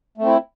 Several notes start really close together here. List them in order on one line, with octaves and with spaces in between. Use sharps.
A3 C4 E4